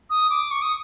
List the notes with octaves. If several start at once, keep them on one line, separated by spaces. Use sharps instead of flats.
D#6
D6
C#6
D#6